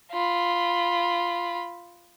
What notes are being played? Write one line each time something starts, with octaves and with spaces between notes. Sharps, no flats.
F4 B5